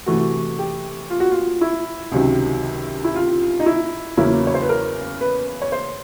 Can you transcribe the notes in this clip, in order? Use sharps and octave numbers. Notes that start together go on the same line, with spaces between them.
C3 E3 A3 F#4
G4
F4
F#4
F4
E4
C#2 C3 D#3 F#3
E4
F4
D#4
E4
E2 C#3 F#3 A#3 C#4 E4
C#5
C5
B4
A#4
B4
C#5
C5